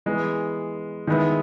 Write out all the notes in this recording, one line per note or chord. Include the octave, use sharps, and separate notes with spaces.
E3 G#3 B3
D#3 G#3 B3 E4